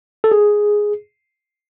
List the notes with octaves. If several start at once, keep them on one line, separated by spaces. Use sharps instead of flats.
A4
G#4